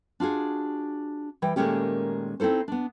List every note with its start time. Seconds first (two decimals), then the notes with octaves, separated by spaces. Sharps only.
0.20 D4 F4 F#4 G#4
1.42 E3 G3 G5
1.56 A#2 D#3 G#3 A3 C#4 G4
2.40 C4 D#4 E4 A4 C5
2.68 B3 D4